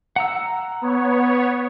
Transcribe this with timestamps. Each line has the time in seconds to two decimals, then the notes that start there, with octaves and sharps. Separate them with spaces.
0.16 F#5 A#5 E6
0.82 B3 C#5